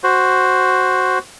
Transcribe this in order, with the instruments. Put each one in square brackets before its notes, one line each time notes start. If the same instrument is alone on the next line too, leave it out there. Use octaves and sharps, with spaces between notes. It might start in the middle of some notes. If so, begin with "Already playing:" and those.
[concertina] F#4 C5